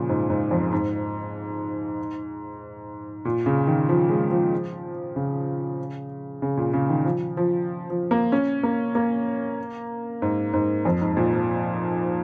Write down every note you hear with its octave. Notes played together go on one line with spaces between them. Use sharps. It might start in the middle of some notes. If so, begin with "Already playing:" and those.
Already playing: A#2 C#3 F3
G#2
G#2
F2
G#2
A#2
C#3
D#3
F3
G#3
F3
C#3
C#3
A#2
C#3
D#3
F3
F3
F3
A#3
C#4
A#3
A#3
G#2
G#2
F2
G#2
A#2
F3